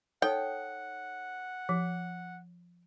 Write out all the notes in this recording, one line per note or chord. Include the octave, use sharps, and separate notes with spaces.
D#4 A4 C#5 F#5 G5
F3